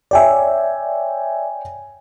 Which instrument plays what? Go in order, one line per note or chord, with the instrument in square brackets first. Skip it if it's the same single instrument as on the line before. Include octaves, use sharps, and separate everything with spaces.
[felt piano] C#5 G5 G#5 [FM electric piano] D5 E5